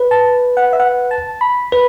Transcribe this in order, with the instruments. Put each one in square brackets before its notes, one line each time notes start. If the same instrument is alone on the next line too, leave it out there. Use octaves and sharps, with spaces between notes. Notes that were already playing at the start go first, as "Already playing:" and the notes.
Already playing: [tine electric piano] B4
[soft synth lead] A5
F#5
E5
F#5
A5
B5
[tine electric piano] B4 [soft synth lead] B5